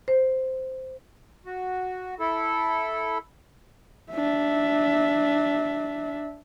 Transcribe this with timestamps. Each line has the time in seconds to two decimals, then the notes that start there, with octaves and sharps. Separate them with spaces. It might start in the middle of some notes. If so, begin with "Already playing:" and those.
0.08 C5
1.46 F#4
2.20 E4 A4
4.12 D4 E5